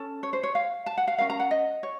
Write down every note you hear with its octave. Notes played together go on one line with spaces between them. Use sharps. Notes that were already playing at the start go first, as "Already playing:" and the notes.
Already playing: C#4 A4
C#5
C5
C#5
F5
A5
F#5
F5
C#4 F4 A#4 F5
A#5
F#5
D#5
C#5